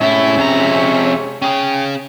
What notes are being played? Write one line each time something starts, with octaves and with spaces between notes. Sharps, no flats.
A2 C3 G#3 C#4 E4 E5
F2 A#5
C#4 G#4 G5